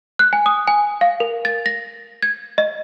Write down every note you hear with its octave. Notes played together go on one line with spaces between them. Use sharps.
F#6
G#5
D#6
G#5
F5
A#4
A6
A#6
G#6
D#5